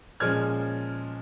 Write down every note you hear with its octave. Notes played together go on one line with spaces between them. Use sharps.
A#2 F3 G#3 C#4 F6 G#6